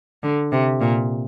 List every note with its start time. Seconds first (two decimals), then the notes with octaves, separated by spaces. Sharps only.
0.23 D3
0.52 C3
0.81 A#2